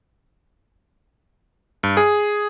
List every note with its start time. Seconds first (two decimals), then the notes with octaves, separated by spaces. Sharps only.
1.83 G2
1.97 G#4